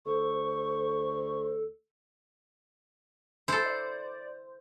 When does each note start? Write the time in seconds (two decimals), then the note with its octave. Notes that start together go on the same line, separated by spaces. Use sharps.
0.06 D2 A4 C5 C#6
3.48 E4 A4 C5
3.66 D5